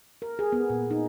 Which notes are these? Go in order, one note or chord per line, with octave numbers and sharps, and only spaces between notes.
A#4
G#4
B3
A#2
D#4